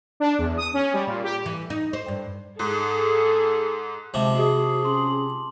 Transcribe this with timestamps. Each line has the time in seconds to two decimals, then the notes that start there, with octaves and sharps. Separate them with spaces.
0.20 D4
0.38 E2
0.57 D#6
0.74 C#4
0.93 G3
1.07 A#2
1.24 G4
1.46 E3
1.70 D#4
1.93 C5
2.08 G2
2.59 G#2 G#4 A4
4.14 C3 F3 G#3 A5 D6 F#7
4.36 F#4 G#4
4.85 C#4 C6 F#7